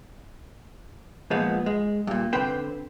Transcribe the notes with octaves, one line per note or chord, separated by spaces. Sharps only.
A#2 F3 G#3 B3
G#3
G2 A#2
D3 C4 B4 C5 G5